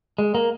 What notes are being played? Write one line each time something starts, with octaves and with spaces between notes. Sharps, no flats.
G#3
A#3